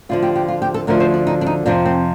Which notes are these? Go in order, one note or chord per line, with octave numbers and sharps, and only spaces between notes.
D2 D3 F3 F4
G4
G4
F4
G4
A4
D2 D3 F3 A#4
C5
D4
D#4
D4
D#4
F2 C3 F3 D4
C4